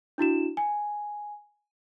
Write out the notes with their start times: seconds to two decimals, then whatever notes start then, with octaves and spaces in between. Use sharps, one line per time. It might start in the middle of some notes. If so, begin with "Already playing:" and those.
0.18 D4 E4 F#4 E7
0.57 G#5